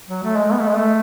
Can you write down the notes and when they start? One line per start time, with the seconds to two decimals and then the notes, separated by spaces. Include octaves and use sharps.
0.09 F#3
0.23 A3
0.37 G#3
0.52 B3
0.60 A3
0.68 G#3
0.76 A3